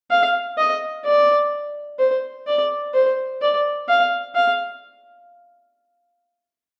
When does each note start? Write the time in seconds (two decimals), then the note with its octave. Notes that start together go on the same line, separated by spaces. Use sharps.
0.10 F5
0.58 D#5
1.05 D5
1.99 C5
2.46 D5
2.94 C5
3.41 D5
3.88 F5
4.35 F5